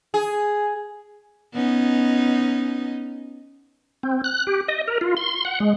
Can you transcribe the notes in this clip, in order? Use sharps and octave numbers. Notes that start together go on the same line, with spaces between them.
G#4
B3 C#4 D#4
C4
F#6
G4
D#5
A#4
F4
C6
F#5
G#3